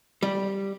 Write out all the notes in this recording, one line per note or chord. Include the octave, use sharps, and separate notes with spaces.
G3